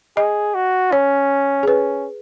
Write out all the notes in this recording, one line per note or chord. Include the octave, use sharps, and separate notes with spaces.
G#4 D#5
F#4
C#4 C#5
G#4
C#4 B4